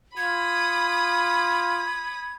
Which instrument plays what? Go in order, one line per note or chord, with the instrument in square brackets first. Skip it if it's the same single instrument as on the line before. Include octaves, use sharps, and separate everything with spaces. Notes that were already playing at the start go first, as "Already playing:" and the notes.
[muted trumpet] F4 [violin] B5 D#6 [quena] G#6